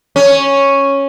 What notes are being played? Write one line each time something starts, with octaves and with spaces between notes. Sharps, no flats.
C#4